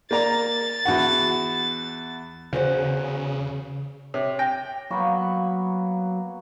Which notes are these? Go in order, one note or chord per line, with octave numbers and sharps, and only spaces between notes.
A#3 D5 A#5 A6
E2 F#4 F#5
E2 C#3 F#4 C5
C3 C#5
G5 A#6
F#3 A#3 B3 B5 C#6